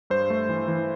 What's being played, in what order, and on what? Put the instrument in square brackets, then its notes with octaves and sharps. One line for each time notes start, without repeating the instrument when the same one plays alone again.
[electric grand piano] G2 C5
A3
E3
E3